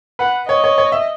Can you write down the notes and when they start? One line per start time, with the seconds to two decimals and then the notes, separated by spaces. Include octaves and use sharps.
0.19 B4 F#5
0.48 C#5 D#5
0.64 C#5
0.78 C#5
0.92 E5